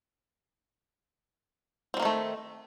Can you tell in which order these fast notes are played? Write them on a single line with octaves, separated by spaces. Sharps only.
C4 G3 A#3 D#3 A3